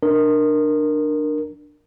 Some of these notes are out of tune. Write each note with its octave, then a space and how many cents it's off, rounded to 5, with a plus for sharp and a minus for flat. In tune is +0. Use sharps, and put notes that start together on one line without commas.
D4 +20 A#4 +0